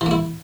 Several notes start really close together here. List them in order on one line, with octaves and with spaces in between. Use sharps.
E3 A#3 E4